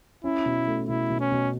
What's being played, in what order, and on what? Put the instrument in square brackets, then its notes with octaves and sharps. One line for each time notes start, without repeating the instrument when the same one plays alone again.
[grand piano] C#4 [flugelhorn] E4
[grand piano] B2
A3
[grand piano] B2 [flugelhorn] E4
[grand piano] B2
[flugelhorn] C#4
[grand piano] B2